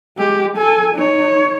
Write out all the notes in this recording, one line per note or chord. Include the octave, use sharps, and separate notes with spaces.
G#3 G4
A4 G#5
D#4 C#5